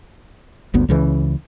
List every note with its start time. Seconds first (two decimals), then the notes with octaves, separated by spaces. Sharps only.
0.74 G1 D2 B3
0.89 C#2 C#3 E3